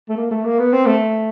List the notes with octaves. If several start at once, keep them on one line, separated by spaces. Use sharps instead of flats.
A3
A#3
A3
A#3
B3
C4
A3